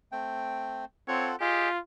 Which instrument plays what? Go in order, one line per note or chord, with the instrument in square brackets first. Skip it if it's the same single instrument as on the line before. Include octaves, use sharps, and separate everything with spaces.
[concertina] A3 C4 G5
[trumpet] C4 [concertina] F4 A4 F#5 [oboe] C#5
[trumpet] F4 [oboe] G4 [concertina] G#4 D#5 G#5